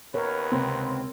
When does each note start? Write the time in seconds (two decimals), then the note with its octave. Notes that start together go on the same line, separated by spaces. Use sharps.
0.14 D#2 B3 A#4 B4 C#5
0.52 C#2 C3 C4